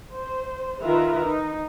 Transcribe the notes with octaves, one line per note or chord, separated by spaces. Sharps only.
C5
D#3 F4 A#4 B4 E5 A#5
D#4